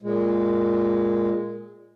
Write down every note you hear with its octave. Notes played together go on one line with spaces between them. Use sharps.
A#2 G#3